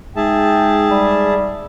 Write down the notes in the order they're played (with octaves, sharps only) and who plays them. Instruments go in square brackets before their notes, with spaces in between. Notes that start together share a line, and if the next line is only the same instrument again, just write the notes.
[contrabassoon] G#2 [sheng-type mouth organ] G#4 E5 A5 [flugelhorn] G5
[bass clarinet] G3